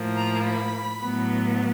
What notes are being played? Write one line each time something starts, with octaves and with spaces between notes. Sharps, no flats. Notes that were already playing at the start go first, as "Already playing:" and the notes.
Already playing: A2 F3 A#3
A#5
B5
A2 F#3 B3